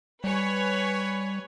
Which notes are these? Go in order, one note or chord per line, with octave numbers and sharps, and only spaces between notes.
G3 B4 C#5 G#5